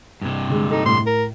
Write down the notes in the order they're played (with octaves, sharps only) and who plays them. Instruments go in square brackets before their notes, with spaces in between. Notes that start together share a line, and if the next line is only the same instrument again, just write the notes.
[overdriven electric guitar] G2 C3
[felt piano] D3 G#3
[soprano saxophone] D#4 [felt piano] A4
[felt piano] A2 [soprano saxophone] C6
[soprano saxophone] A#4